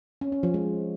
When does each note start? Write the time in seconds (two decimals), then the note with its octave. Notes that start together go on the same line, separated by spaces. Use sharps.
0.21 C#4
0.32 C#4
0.43 F3
0.54 G#3